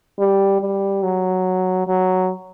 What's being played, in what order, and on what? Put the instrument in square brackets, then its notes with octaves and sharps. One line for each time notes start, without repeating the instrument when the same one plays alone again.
[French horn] G3
G3
F#3
F#3